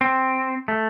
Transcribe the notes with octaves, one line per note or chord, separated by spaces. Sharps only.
C4
A3